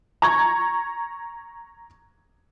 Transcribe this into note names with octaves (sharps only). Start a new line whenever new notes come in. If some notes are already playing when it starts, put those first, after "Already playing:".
A#5 C#6 G#6